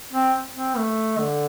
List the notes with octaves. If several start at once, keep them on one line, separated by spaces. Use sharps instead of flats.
C4
C4
A3
D3